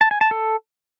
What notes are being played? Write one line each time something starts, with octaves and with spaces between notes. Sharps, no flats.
A5
G#5
A5
A4